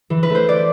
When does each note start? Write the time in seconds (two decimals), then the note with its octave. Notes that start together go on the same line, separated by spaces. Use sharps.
0.10 E3
0.23 B4
0.30 A3
0.35 C5
0.49 D5